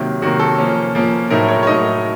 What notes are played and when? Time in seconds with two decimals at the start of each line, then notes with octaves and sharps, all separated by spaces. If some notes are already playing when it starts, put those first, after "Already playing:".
Already playing: C3 D#3 F#3 A#3
0.22 C3 D#3 F#3 A#3 F#4
0.39 A4
0.58 F3 A#3 C#4
0.95 F3 A#3 C#4
1.30 A2 F#3 A3 D#4 A#4
1.49 C#5
1.63 C#5
1.67 A2 F#3 A3 D#4 D#5